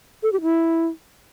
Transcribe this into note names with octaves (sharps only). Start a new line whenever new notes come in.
A4
G4
E4